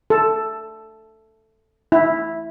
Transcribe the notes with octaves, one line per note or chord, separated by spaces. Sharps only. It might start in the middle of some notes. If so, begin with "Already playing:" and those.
A4
E4